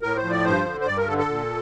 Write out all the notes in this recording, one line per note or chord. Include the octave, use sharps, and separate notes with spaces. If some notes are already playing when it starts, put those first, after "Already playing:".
A2 A#4
C5
F3
D5
G2 C5
D3
C5
G2 D5
A#4
D3 A4
A4
A#2